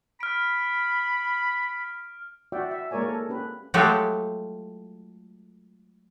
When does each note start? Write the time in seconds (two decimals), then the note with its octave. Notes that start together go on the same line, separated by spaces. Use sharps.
0.20 B5 F6 D7
2.52 F#4 D5 E5 F#5 G5
2.71 E5
2.91 G#3 A#3 A#4 C#5 D5 G#5
3.09 A4
3.29 C#4 G4 B4
3.74 F#3 G#3 A3 F4 G4 A4